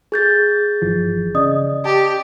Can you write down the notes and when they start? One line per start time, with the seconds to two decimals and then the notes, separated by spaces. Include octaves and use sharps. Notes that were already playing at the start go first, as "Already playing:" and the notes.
0.12 G#4 G6 A6
0.82 G1 E3 F3
1.35 C#3 D5 D#5 D#6
1.85 G4 G5 A5